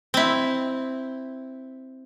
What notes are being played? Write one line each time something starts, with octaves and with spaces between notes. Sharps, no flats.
C4 E4